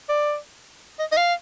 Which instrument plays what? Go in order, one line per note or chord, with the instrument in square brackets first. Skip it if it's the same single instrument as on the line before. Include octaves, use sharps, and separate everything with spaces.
[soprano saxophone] D5
D#5
D#5
F5